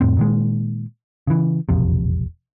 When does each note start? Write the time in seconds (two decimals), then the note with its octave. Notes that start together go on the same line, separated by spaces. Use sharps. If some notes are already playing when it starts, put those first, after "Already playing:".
0.01 F2 A2 C4
0.17 A#2 D#3 G#3
1.27 C#3 E3
1.69 E1 A#1 F2 C3